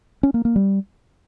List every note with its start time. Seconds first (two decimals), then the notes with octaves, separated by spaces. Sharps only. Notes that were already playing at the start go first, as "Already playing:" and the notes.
0.23 C#4
0.34 A#3
0.45 A#3
0.56 G3